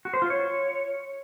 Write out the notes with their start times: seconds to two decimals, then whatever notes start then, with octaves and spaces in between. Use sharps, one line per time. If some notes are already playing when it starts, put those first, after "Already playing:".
0.05 F#4
0.14 C5
0.22 F4
0.30 C#5